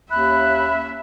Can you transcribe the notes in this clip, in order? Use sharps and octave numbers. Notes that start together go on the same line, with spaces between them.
D#2 C#4 E5 B5 F#6